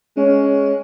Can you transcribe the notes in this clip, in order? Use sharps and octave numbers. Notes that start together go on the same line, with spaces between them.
G#3 C#4